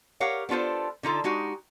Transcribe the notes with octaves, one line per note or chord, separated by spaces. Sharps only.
G4 A#4 C#5 F5 F#5
B3 D4 F4 A4 C5
D3 D#4 F4 A4
G#3 D#4 F#4 G4